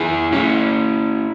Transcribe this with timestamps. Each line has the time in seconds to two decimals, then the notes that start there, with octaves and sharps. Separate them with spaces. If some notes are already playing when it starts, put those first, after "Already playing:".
Already playing: E4 G#4
0.32 C#4 E4